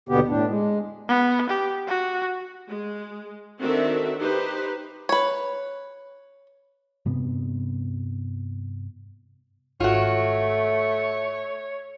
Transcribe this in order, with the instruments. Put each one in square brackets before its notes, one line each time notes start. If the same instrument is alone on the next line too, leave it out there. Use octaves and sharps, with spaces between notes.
[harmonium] D#2 B2 D3 B3 G4
A2 D4
G#3
[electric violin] B3
G4
F#4
[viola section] G#3
D#3 C4 D4 F#4 A4 E5
D#4 G4 B4 C5
[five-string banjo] B4 C#5
[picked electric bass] G2 C3 B3
[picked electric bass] G#1 [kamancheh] A3 [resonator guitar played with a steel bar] F4 F#4 [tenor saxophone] C#5